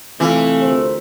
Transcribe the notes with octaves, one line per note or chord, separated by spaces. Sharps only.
C3 E3 A3 F4 F5
D2 A#4 C5